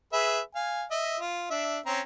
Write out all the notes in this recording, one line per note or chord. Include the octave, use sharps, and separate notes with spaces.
G#4 B4 E5
F5 G#5
D#5 E5
F4
D4 E5
C4 C#4 A#5